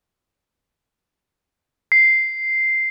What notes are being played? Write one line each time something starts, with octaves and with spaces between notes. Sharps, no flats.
C7